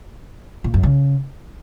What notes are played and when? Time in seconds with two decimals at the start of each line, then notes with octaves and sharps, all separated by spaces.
0.64 A#2
0.74 F#2
0.83 C#3